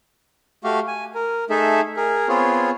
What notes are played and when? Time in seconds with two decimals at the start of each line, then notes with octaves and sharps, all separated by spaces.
0.64 A3 F#4 G4 F5
0.87 G#5
1.15 A#4
1.50 A3 D#4 G#4 A4 E5
1.96 G#4 A#4
2.29 B3 C4 F4 G#4 C#5